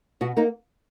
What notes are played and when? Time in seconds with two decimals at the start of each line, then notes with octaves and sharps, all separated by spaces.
0.21 B2 F#4
0.37 A#3 D#4